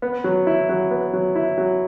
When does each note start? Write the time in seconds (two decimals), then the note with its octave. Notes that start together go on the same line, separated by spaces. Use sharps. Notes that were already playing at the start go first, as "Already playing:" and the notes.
0.02 B3
0.24 F#3
0.47 E4
0.69 F#3
0.91 B3
1.13 F#3
1.36 E4
1.58 F#3